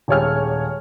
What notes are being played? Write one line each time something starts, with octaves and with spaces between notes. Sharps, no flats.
D#1 G#3 G4 C#5 G#5 F6